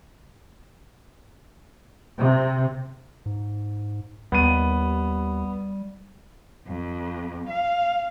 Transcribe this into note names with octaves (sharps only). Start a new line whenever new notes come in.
C3
G#2
D#2 G3 B3 D#7
F2
F5